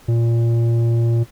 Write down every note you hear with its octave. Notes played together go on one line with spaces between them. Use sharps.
A#2